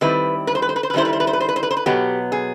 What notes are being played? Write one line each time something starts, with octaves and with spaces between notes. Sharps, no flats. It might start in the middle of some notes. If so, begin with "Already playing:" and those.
D#3 G3 C4 E4 B4
B4
C5
B4
C5
B4
C5
B4
D#3 G3 C4 E4 C5
B4
C5
B4
C5
B4
C5
B4
C5
B4
C5
B4
B2 F#3 B3 G4
G#4